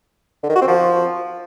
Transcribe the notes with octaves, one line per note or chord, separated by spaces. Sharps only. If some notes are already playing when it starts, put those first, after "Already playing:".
D3
D#3
F#4
C4
F3